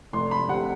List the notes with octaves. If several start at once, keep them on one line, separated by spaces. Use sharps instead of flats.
F1 C6
B5
C3 F#5